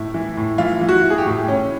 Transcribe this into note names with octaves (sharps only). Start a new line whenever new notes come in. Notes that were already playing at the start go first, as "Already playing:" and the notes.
Already playing: A2 E4
E3
A2
E3 F4
E3
F#4
E3
G#4
G4
A2
A2 C#4